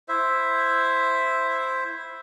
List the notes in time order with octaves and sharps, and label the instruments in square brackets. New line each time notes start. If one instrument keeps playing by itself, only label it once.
[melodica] E4 C5 E5